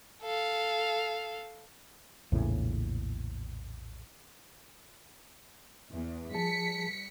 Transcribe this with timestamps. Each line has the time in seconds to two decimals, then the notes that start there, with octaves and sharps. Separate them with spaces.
0.23 A4 F5
2.32 A#1 E2 A2 C#3
5.93 E2
6.35 F3 G3 G#4 A5 B6 C#7